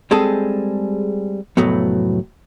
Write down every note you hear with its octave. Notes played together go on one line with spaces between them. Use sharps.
G3 G#3 C4 G#4 A4
C2 F2 A2 F#3 A3 B3